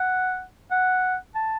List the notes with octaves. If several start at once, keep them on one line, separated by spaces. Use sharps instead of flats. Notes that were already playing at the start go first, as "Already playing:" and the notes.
Already playing: F#5
F#5
A5